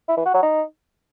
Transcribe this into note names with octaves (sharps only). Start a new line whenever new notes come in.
E4
E3
F#4
F#3
D#4